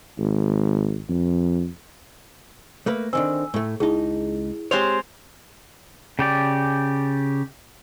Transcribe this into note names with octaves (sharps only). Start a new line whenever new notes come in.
G#1
F2
A3 A#3 B4
D3 D#3 C4 G#5 E6
A2 A3
C#2 D#4 E4 G#4
G#3 C4 G4 C5 C#5 F7
C#3 G4 D5